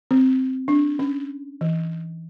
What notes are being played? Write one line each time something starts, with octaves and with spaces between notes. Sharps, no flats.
C4
D4
C#4
E3